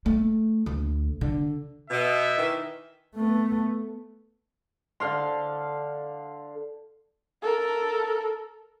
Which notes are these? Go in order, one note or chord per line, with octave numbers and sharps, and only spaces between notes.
A3
D2
D3
B2 E5
D#3 E3
A3 B3
D3 F5 C6
A4 A#4